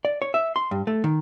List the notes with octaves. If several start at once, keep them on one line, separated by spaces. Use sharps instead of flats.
D5
C#5
E5
C6
G2
A3
D#3